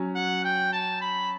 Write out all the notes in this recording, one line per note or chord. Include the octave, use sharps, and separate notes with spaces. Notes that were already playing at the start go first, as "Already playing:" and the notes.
Already playing: F#3 C#4
F#5
G5
A5
B5